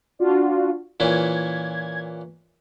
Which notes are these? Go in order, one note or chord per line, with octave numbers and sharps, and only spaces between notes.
D4 F4 F#4
A#2 E3 C#4 G#6